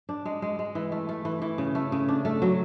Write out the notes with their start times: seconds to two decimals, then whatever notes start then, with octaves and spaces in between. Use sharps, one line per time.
0.09 D4
0.25 G#3
0.42 G#3
0.59 G#3
0.75 E3
0.92 A3
1.09 A3
1.25 E3
1.42 E3
1.58 C#3
1.75 A3
1.92 C#3
2.08 D4
2.25 A3
2.42 F#3